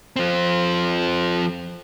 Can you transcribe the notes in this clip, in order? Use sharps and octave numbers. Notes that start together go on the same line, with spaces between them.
F3 C4